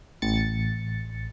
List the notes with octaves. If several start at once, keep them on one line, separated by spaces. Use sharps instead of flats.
A1 A6 C#7